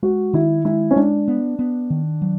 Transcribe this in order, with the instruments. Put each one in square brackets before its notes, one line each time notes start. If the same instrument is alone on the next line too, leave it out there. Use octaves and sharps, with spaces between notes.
[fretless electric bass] G#3 [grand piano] F#4
[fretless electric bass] D#3 [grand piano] E4
[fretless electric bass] G#3 [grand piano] E4
[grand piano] C#4
[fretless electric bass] G#3 [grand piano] D4
[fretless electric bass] B3
B3
D#3
F#3